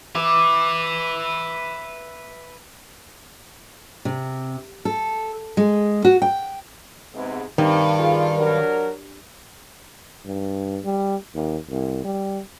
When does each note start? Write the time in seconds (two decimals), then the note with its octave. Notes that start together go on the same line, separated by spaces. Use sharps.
0.15 B4 E5 D6
4.05 C3
4.85 A4
5.57 G#3
6.05 F#4
6.22 G5
7.14 G#2 C3 B3
7.58 G2 C3 D#3
7.98 F4 G#4
8.36 F#3 D4 A#4
10.26 G2
10.84 G3
11.35 D#2
11.70 C2
12.04 G3